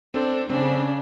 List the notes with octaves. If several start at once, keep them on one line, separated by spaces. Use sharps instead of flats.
C4 D4 A4 C5
C#3 C4 D4